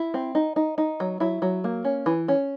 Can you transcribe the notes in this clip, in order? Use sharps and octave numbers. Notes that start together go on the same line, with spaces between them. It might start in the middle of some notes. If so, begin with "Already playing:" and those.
Already playing: E4
C4
D#4
D#4
D#4
F#3
F#3 E4
F#3
A#3
C#4
E3
C#4